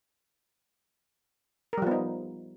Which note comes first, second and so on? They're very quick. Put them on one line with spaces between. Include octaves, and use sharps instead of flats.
A#4 G3 F3 B3 D#4